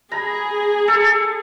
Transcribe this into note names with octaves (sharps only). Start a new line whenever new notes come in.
G#4 A#5 B5
A4